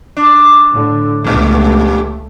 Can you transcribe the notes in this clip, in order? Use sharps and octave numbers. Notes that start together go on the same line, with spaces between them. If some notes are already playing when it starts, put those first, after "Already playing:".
D4
A2 D3
C#2 G2 A#2 F3 A3